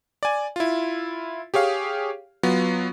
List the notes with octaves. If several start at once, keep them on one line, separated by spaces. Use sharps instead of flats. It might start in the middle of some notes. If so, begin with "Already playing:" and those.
D5 G#5
E4 F4
G4 G#4 C#5 F5
F#3 B3 F4